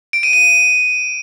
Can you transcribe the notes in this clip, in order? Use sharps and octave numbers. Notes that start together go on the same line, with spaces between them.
D7
D#7
D#7